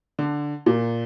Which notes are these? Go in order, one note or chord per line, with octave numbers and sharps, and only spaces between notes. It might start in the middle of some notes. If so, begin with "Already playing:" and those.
D3
A#2